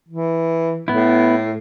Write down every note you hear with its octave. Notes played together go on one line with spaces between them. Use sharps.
E3
A2 B3 E4